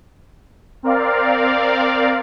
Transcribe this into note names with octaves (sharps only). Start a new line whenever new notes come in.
C4 A#4 D5 F5